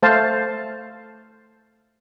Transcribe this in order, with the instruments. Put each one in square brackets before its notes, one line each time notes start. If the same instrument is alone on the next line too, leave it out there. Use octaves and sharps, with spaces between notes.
[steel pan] A3 C5 F5 A5